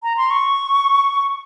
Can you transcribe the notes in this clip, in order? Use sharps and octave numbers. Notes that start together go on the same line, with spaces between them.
A#5
C6
C#6